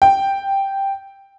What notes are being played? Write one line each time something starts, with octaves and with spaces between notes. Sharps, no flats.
G5